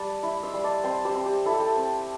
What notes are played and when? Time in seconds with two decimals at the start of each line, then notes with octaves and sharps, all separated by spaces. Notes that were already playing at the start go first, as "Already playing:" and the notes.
Already playing: G3 A5 D6
0.23 E4
0.43 C6 E6
0.54 G3 C6
0.64 A5 D6
0.84 C4 G5 C6
1.05 G4 C5
1.15 C4
1.26 G4
1.46 E4 A4
1.53 G4
1.61 A4
1.76 C4